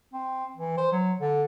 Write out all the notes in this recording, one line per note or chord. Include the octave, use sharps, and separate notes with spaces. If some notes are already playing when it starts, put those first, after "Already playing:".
C4
E3
C5
F#3
D3